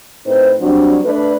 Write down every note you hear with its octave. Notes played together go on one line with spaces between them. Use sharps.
A2 C4 D#4 B4 C5
F#3 G3 C4 D4
A3 D4 B4